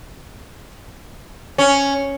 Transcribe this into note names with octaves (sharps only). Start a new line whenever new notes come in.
C#4